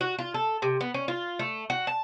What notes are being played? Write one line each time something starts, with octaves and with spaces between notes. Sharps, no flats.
F#4
F4
A4
C3
B3
C#4
F4
A3
F#4
A5